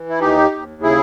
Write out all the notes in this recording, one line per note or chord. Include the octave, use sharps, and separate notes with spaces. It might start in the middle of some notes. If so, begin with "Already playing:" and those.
Already playing: E3
E4
D#2 D#4 G4
D#2
C#3 E4 G#4